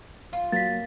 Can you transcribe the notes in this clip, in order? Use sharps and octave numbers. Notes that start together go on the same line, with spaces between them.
F4
F#3 A#3 A6 B6